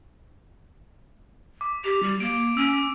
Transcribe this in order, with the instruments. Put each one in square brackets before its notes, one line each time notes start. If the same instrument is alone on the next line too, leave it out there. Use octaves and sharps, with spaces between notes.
[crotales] D6
[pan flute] G4 [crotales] F7
[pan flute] G3
[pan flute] A#3 [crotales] D7
[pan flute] C#4 [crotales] E6